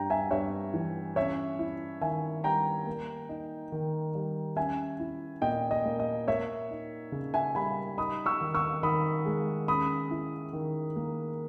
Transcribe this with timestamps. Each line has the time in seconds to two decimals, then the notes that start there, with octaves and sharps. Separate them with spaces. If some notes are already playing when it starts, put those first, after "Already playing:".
Already playing: G2 G3 G5 A#5
0.10 E5 G#5
0.31 G2 C#5 E5
0.74 E3
1.16 C#4 C#5 E5
1.59 E4
2.01 D#3 E5 G#5
2.44 G3 G5 A#5
2.87 A#3
3.29 D#4
3.72 D#3
4.15 G3
4.56 C#4 E5 G#5
5.00 E4
5.42 A#2 D#5 G5
5.71 D#5
5.85 A#3
6.00 D#5
6.28 A#3 C#5 E5
6.71 D#4
7.12 C#3
7.34 E5 G#5
7.55 G3 G#5 B5
7.98 D#4 B5 D#6
8.26 C#6 E6
8.41 D#3
8.55 C#6 E6
8.83 D#3 B5 D#6
9.26 G#3
9.68 C#4 B5 D#6
10.11 E4
10.53 D#3
10.96 A#3